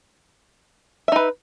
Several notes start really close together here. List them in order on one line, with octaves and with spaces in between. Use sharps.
E5 D#4 B4